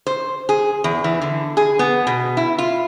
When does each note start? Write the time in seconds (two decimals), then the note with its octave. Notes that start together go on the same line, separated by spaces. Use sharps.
0.07 C5
0.49 G#4
0.84 E2
1.04 E3
1.21 D3
1.57 G#4
1.79 B3
2.07 B2
2.37 E4
2.58 F4